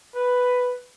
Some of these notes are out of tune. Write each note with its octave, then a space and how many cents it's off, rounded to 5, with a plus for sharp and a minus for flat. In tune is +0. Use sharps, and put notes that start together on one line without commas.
B4 +5